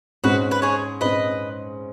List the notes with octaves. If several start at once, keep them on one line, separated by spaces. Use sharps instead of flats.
G#2 G#3 C#4 F#4 B4
B4
G#4 C#5
G#2 G#3 C#4 B4 D#5